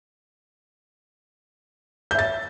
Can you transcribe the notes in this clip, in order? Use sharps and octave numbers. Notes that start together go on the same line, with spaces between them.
E5 G6 A6